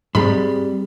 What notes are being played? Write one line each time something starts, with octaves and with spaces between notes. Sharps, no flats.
G#2 G3 G#3 C4 B5